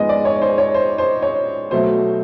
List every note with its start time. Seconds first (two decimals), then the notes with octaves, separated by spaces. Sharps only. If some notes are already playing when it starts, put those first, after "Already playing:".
Already playing: G#2 F3 G#3 B3 D#5
0.09 D5
0.25 C#5
0.42 C5
0.58 C#5
0.75 C5
0.98 C5
1.22 C#5
1.71 B2 F#3 A3 C5